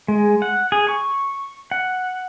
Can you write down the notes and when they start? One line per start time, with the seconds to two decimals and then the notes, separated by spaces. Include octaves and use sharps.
0.08 G#3
0.42 F#5
0.72 G#4
0.89 C#6
1.71 F#5